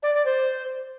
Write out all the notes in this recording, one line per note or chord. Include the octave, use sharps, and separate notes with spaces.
D5
D5
C5